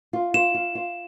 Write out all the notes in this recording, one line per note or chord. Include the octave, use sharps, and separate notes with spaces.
F4
F4 E7
F4
F4